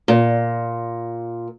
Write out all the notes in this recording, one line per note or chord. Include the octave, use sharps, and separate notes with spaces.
A#2